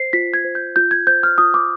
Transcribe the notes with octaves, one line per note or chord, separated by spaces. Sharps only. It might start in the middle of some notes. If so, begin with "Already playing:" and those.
Already playing: C5 C7
F4 B6
G#6
C5
G6
F4 G6
G#6
C5 G6
F6
F4 D#6
D6